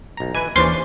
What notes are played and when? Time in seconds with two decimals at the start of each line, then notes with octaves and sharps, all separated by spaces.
0.17 B1 A#5
0.35 E3 E4 B4 G#5
0.56 D#2 E3 C#4 D4 C5 C6 C7